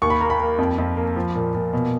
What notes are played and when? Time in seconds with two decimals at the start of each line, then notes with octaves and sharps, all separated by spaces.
0.02 D#2 C#6
0.10 B5
0.21 A#3 A#5
0.30 B5
0.40 A#3
0.58 F2
0.78 F2
0.97 A#3
1.16 F3
1.35 A#2
1.55 A#2
1.73 B2